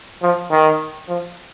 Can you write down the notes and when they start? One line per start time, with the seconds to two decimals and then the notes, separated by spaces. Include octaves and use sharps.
0.22 F3
0.51 D#3
1.08 F3